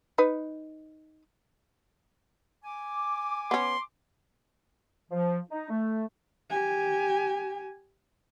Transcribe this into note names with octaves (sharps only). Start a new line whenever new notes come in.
D#4 B4
G#5 D6
B3 C#4 C6
F3
D#4
A3
G4 G#5